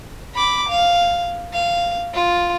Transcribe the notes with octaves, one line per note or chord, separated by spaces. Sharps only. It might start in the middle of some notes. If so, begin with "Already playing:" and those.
B5 D6
F5
F5
F4